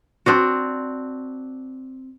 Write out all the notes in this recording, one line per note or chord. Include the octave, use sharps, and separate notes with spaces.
C4 D4 F#4